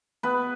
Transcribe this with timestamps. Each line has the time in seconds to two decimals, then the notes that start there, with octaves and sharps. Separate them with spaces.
0.23 B3 B4